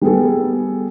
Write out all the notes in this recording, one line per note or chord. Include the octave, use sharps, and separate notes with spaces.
G3 B3 G#4 A4